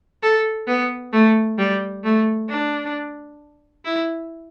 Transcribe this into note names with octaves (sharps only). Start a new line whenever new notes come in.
A4
B3
A3
G3
A3
D4
E4